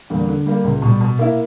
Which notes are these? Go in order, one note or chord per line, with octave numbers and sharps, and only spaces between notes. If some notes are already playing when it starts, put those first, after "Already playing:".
E2 D3 G3 A#3
D3
G3 A#3
C#2
B2 G3
B2
A#3 E4